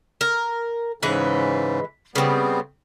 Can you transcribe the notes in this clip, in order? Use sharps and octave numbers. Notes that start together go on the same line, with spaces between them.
A#4
G#2 C#3 E3 G#3 B4
C#3 G3 B3 C4